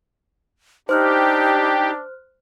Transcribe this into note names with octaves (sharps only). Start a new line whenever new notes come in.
D4 D#4 G4 C5 F6 F#6